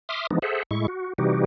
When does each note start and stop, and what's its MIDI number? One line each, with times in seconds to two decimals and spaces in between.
0.09 0.27 76
0.09 0.27 84
0.09 0.27 86
0.09 0.27 87
0.09 0.27 89
0.31 0.39 52
0.31 0.39 53
0.31 0.39 56
0.31 0.39 59
0.31 0.39 62
0.31 0.39 63
0.42 0.63 68
0.42 0.63 69
0.42 0.63 72
0.42 0.63 76
0.42 0.63 78
0.71 0.87 45
0.71 0.87 56
0.71 0.87 64
0.71 0.87 85
0.88 1.13 66
1.18 1.45 48
1.18 1.45 52
1.18 1.45 55
1.18 1.45 63
1.18 1.45 66
1.18 1.45 67